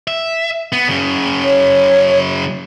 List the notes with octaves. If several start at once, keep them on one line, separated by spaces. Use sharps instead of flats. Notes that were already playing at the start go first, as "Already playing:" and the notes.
E5
B3
F#2 C#3
C#5